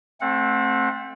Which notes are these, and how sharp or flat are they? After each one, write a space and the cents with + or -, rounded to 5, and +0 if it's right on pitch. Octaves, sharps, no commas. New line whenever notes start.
A3 +0 C4 +20 F#5 -30